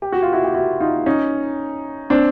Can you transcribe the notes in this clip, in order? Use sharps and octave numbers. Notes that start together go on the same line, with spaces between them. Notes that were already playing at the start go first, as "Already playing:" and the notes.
G4
F#4
F4
E4 F#4
G4
E4 F#4
D#4 F4
C#4 D#4
C4 D4